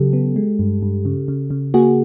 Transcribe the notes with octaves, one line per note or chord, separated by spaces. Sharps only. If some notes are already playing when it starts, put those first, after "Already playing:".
Already playing: C#3 F#3 G4 A4
B3
G#3
G2
G2
C#3
C#3
C#3
A#3 F#4 G#4